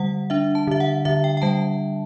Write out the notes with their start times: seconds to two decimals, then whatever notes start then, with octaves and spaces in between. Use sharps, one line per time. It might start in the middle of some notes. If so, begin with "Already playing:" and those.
Already playing: D3 G3 F#5
0.30 D4 E5
0.55 A5
0.67 D3 E5
0.80 F#5
1.05 D3 E5
1.24 G5
1.37 G5
1.42 G3 A5